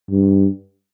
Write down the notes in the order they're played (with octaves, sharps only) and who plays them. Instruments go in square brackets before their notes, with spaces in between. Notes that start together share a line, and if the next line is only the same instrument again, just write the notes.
[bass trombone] G2